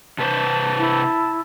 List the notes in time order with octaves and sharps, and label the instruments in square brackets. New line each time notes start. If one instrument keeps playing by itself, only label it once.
[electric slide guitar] C3 B4 C5 [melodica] A5
[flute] E4